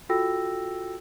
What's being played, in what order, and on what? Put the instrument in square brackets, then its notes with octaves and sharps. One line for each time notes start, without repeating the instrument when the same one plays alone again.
[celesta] F4 F#4 A4 G5 E6 A#6